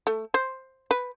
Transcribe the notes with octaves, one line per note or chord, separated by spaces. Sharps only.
A3
C5
B4